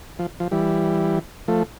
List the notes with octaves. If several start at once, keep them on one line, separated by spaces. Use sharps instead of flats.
F3
F3
E3 G3
F3 A3